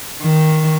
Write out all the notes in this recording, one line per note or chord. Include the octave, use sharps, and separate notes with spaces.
D#3